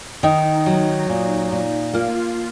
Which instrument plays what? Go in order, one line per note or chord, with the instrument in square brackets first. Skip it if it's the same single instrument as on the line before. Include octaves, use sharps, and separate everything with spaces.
[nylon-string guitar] D#3 [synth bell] D#4
[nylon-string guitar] F#3
A#2
A#2
[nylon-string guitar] A#3 [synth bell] F4